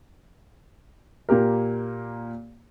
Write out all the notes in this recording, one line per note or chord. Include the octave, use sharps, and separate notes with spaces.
A#2 A#3 G4 A#4